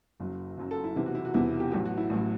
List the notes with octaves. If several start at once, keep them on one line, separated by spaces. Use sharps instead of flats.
F#1 F#2 F#3
F#1 F#2 F#3
A4
E4
E1 E2 C3 E4
F#4
E4
F#4
E1 E2 C3 E4
G4
A1 A2 F#3 G4
F#4
E4
A1 A2 F#3